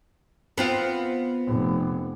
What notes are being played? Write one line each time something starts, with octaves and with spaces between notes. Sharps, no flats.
B3 C4 F4
F1